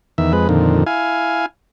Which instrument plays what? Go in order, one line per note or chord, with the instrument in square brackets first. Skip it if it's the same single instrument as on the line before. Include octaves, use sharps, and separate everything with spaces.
[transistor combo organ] E2 D#3 E5
F2 G#3 B4
F2 A#2 D3 D#3
E4 F5 G#5